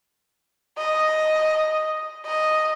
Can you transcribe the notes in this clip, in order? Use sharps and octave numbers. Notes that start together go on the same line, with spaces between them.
D#5
D#5